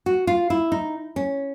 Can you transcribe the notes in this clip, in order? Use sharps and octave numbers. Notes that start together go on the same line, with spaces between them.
F#4
F4
E4
D#4
C#4